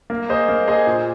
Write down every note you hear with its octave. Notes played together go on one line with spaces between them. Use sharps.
A#3
G#4 C5 D#5
A#3
G#4 C5 D#5
A#2